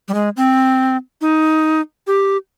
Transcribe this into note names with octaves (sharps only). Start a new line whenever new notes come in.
G3
G#3
C4
D#4
G4